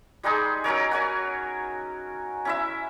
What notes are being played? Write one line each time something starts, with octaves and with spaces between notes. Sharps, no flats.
G3 G#3 D#4 G#4
F#3 C#4 A#4 C#5
F#4 C#5 G#5
C#4 E4 E5